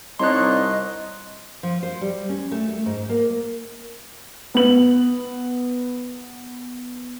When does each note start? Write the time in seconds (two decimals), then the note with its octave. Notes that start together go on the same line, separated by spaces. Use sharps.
0.19 C2 D4 D#4 C#5 D#5 C6 F#6
1.63 F3
1.83 C5
2.01 G3
2.29 C#4
2.51 A3
2.68 A3
2.86 G#2
3.09 A#3
4.54 B3 F#7